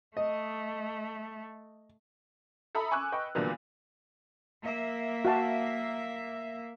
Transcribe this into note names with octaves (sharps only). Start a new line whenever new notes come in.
A3 D#5
A4 E5 A#5 B5 D#6
G#5 C#6 D6 E6 F#6
B4 D#5 G5 C#6
A#2 D3 E3 F#3 G3 B3
A#3 E5
F#4 F5 A5